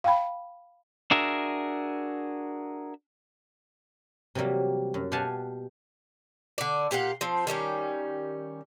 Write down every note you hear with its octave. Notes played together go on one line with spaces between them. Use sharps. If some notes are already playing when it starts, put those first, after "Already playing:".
F5 G5 B5
D4 F#4 G#4 A#4 E5
C3 E3 F#3 G3 A#3
F#2
B2 G4 F5 F#5 G#5 A5
D3 D5
A#2 G4 F5 F#5
F3 C4
D#3 G3 A3 C#4